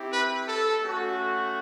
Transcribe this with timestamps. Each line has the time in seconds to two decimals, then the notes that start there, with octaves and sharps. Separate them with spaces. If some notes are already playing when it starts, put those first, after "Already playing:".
Already playing: C4 E4 G4
0.11 B4
0.46 A4
0.81 A3 C#4 F#4